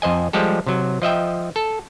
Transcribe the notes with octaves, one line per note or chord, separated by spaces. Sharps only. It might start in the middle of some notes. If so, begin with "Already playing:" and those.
F2 C5 D#5 G#5
F3 G3 G#3 G4 A4
C3 F#3
F3 D#5 E5 G5
A4